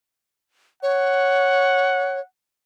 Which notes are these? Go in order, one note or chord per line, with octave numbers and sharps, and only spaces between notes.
C#5 F#5